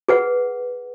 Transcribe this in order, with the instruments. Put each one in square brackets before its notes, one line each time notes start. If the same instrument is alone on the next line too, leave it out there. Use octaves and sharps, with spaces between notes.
[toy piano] G#4 B4 F#5